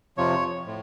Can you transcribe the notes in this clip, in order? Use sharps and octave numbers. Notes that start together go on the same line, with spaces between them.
F2 C3 F3 C#5
A2